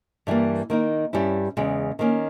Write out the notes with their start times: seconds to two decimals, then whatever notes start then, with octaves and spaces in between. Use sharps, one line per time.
0.27 G2 E3 G3 A#3
0.70 D#3 A#3 D#4
1.13 G2 G3 C#4 E4
1.57 E2 C#3 G#3
1.99 D#3 A#3 C#4